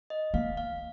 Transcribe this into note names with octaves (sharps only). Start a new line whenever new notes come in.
D#5
A#3 F5
F5